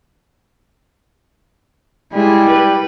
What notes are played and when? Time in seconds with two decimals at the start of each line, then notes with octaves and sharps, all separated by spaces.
2.13 G3 G#3 E4
2.49 B4